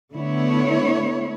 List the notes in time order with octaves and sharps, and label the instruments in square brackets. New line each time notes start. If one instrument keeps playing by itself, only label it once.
[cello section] D3 A3 B3 E4 C#5